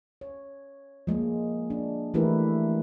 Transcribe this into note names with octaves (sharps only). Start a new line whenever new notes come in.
C#5
F3 G#3 A#3
D4
E3 A3 E4 G4 A#4 B4